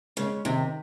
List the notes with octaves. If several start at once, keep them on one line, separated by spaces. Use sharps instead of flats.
C#3 G#3 C#4
C3 D#3